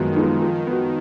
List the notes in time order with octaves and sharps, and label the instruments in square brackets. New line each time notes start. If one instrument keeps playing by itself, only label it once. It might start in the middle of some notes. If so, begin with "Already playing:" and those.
Already playing: [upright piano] F#2 F3 G#3 B3 D#4 [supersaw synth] D#3
[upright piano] F3 G#3 B3 D#4
F3
B3 F#4